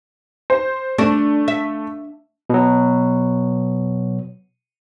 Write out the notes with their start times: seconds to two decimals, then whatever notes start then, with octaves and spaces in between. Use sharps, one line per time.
0.50 C5
0.98 A3 D4
1.48 E5
2.50 B2 F#3